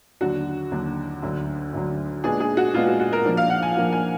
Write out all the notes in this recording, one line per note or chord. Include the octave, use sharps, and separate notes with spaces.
D#2 D3 F#3 D4 F#4
D#2 D3 F#3 D4
D2 D3 F#3
D2 D3 F#3
A#2 G#3 B3 D4 G#4
G#4
F#4
A#2 G#3 B3 D4 F4
F#4
F#4
A#4
A#2 F3 A#3 D4
F5
F#5
G#5
A#2 F3 A#3 D4
G#5